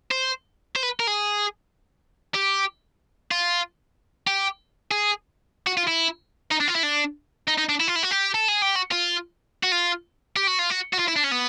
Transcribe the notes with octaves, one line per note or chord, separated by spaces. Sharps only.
C5
C5
B4
A#4
G#4
G4
F4
G4
G#4
F#4
F4
E4
D#4
D4
F4
E4
D4
D#4
D#4
D4
E4
F4
E4
F#4
G4
A4
G#4
G4
F#4
F4
F#4
F4
G4
F#4
F4
F#4
F#4
F4
E4
D4
C#4
B3